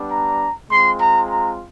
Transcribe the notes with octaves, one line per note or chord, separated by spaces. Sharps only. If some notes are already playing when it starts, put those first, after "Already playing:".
Already playing: G3 B3 D4
A#5
G#3 C4 F4 C6
A#5
A#5